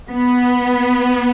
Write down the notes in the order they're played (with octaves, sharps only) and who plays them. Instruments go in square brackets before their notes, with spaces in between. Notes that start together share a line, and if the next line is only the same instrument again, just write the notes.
[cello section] B3